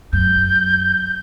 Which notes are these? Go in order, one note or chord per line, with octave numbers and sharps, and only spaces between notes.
F#2 G6